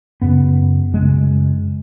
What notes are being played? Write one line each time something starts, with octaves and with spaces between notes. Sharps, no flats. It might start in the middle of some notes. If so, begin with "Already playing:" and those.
F#2 C#3 B3
F#2 C#3 G#3